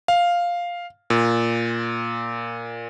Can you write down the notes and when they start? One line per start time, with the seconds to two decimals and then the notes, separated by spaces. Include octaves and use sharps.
0.08 F5
1.10 A#2